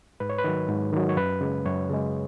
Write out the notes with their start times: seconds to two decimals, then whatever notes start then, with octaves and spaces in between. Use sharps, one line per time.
0.20 G#2 B4
0.29 C#5
0.38 B4
0.44 D#3 F#3
0.69 G#2
0.93 D#3 F#3
1.09 C#5
1.17 F#2 B4
1.41 C#3 G#3
1.66 F#2 C#5
1.90 C#3 G#3